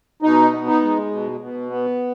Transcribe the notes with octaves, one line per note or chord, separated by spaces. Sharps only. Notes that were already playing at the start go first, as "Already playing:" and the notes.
B2 D#4
B3
D#4
G#3
B2
B2
B3